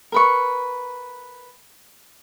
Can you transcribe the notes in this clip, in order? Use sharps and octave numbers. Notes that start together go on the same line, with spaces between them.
A#4 B4 C#6